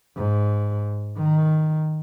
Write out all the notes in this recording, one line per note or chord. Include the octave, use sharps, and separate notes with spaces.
G#2
D#3